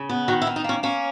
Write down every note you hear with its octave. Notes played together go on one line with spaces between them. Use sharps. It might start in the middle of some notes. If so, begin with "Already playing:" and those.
Already playing: C#3
B3
D#3 F#4
E4
D#3
D#4
A#3 C#4
A#3 C#4